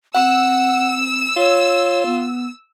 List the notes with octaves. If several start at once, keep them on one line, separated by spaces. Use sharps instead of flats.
C4 F#5 E6
F4 C#5
B3